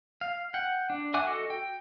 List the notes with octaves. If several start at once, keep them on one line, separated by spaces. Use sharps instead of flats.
F5
F#5 G5
D4
E5 F#5 G#5 D6 F#6
F#4 A4 D#5
G5